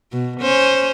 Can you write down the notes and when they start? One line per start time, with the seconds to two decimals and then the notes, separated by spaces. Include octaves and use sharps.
0.13 B2
0.41 C#4 C5